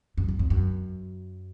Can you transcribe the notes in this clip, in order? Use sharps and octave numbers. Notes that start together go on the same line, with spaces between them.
F#2
F#2
F2
F#2